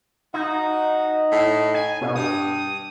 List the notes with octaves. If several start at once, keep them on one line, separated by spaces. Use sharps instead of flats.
D#4 F#4
A2
G#5
B2
G2 D#6